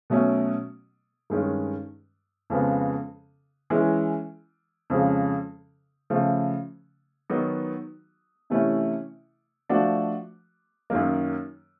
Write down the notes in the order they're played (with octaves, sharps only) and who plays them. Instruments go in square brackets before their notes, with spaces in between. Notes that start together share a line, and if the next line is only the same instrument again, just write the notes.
[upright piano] B2 F#3 A3 C#4
G2 D#3 G#3 C#4
F2 C#3 F3 G#3 B3
E3 G#3 C#4
F2 C#3 F3 G#3 C#4
C#3 F3 A3
D#3 F#3 B3 D#4 F#4
C3 E3 A3 C#4 E4
F3 A3 D4 F#4
F#2 D#3 F#3 A#3